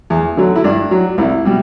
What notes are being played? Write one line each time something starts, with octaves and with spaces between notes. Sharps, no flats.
E2
D3 F#3
E4
G2 D4
F#3
C2 E4
B2 G3